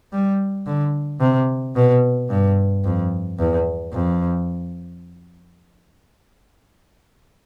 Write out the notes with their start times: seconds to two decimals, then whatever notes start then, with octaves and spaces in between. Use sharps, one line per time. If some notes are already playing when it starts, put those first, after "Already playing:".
0.12 G3
0.66 D3
1.20 C3
1.76 B2
2.30 G2
2.84 F2
3.39 E2
3.93 F2